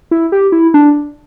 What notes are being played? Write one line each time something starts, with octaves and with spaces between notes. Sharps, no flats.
E4
G4
E4
D4